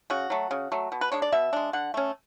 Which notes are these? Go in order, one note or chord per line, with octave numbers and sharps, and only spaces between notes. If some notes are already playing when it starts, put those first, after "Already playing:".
C#3 F#4
F#3 A3
C#3
F#3 A3
B2
B4
G#3 D4 C#5
D5
B2 E5
G#3 D4
D3 F#5
A3 C#4